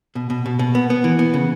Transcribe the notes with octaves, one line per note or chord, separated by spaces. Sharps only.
B2
B2
B2
B2
B3
B3
E3
B3
C#3